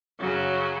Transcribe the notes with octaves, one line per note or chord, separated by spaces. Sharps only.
F#2 C#3 F#3